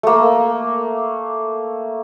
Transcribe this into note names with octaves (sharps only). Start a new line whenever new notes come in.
A3 A#3